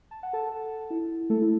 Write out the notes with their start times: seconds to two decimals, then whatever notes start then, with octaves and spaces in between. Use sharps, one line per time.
0.11 A5
0.23 F#5
0.33 A4 A5
0.90 E4
1.30 A3 A4
1.42 E4